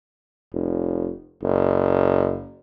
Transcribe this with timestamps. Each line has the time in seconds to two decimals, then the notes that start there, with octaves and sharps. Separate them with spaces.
0.54 F1
1.43 F#1